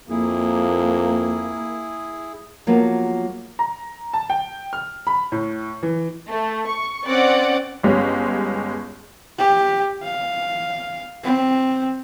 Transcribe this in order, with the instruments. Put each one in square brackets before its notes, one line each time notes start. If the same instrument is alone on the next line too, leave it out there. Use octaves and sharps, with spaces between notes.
[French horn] F2 [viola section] A#3 [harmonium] E4 G#4
[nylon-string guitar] F3 F#3 A#3 B3 G#4
[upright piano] A#5
A5
G5
F6
B5
A2
E3
[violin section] A3
C#6
C4 C#4 D5 F#5
[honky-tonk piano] G1 G#3 C#4 G4
[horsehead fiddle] G4
F5
C4